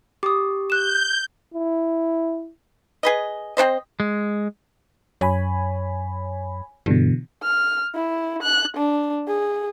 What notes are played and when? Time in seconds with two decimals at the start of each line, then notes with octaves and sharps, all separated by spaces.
0.23 G4 D6 D#6
0.70 F#6 G6 E7
1.54 E4
3.03 G#4 B4 D#5
3.57 C4 D4 C5 D#5
4.00 G#3
5.21 F#2 C#5 G#5 B5
6.86 G2 B2 D3 E3
7.43 F6
7.95 E4
8.42 F#6
8.76 D4
9.28 G#4